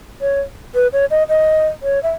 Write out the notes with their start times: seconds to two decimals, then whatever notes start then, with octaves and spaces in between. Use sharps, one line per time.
0.22 C#5
0.75 B4
0.93 C#5
1.11 D#5
1.29 D#5
1.83 C#5
2.03 E5